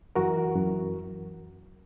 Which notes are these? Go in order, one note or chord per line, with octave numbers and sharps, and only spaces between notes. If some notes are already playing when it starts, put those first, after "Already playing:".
F#2 E3 F#4 A#4
F#2 E3